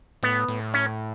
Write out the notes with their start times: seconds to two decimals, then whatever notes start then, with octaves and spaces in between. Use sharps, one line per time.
0.23 A2 B3
0.48 A2
0.74 C#4